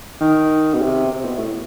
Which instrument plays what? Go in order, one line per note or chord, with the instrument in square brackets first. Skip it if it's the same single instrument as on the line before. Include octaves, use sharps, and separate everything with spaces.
[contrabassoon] D#3
B2
C3
C3
B2
A2